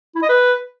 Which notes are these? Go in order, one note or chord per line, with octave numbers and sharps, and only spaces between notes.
E4
D#5
B4